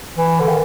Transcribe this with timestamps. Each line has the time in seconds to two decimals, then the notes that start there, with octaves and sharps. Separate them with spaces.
0.17 E3
0.40 D3
0.48 D#3